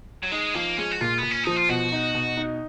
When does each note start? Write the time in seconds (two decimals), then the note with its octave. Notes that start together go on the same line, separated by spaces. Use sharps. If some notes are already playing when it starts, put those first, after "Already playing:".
0.23 F#3
0.31 G#3 D#4
0.54 F3 A#3
0.77 G#3 C#4
0.91 F#4
1.01 A#2 F4
1.18 A#2 B3
1.31 C#4
1.44 F3 D#4
1.56 F4
1.69 B2 F#4
1.92 D#4
2.15 B2
2.37 D#4